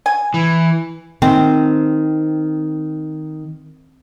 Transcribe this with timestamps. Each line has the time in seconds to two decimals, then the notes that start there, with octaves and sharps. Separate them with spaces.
0.06 G#5
0.34 E3
1.22 D#3 C4